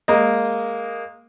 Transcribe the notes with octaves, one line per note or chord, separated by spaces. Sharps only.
G#3 A#3 D#5